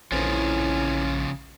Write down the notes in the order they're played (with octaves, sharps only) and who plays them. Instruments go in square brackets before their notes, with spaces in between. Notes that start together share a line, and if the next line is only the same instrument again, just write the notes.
[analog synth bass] A#1 [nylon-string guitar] F2 E3 [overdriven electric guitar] C#3 F3 [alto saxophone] C#4